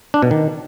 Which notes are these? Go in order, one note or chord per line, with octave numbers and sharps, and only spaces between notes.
D4
B2
D#3